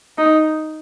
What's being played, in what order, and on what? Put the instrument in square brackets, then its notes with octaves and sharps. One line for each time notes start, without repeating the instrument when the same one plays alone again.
[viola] D#4